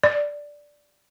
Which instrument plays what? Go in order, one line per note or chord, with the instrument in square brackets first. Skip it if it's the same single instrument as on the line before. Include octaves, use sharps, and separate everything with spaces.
[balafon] D5